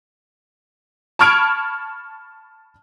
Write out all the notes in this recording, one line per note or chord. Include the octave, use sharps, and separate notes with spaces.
A5 B5 C#6 F6 G#6 D7